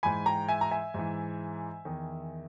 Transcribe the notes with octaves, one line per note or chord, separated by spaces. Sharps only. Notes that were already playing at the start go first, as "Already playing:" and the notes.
G#2 E3 G#5 B5
G5 A#5
E5 G#5
A#5
E5 G#5
G#2 E3
E2 D#3